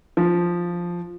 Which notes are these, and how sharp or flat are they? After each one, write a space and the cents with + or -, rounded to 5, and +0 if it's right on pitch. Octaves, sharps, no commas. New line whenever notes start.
F3 +0